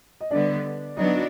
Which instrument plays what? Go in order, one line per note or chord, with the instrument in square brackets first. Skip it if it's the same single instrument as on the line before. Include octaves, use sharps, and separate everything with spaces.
[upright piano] D#5
[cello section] D3 G3 B3 [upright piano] D4 D5
[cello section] F#3 B3 D4 F#4 [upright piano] D#4 D#5